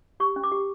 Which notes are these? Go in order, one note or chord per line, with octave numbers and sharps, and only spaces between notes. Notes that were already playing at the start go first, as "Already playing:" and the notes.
G4 C#6
C#4
D6
G4